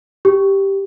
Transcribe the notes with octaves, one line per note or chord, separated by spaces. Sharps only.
G4